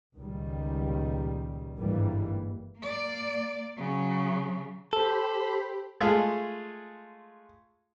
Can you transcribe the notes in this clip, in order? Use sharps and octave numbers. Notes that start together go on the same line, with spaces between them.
C#2 A#2 D#3 G3
G1 G#2 E3 G3 A#3
A#3 D5
C#3 F#3
G4 A4 C5 B5
G#3 A3 F4 G#4